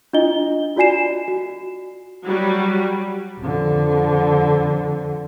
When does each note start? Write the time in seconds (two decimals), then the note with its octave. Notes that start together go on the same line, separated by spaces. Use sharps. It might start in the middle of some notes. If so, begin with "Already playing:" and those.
0.13 D4 E4 F4 D#5 G7
0.77 F4 F#4 D5 G#5 C7 E7
1.28 F#4
2.24 F#3 G3 F#4
3.40 F2 D3